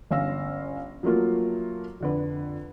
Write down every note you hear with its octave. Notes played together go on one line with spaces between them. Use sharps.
G1 C#4 F5 E6 A#6
F3 F#3 A3 A#3 F4
F2 D3 B4